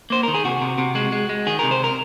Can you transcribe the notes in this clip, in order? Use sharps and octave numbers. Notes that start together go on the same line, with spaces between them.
A#3 C5
D#3 A#4
G#4
C3 F#4
C3
C3
G#3 F#4
G#3
G#3
D#3 G#4
C3 A#4
C5
A#4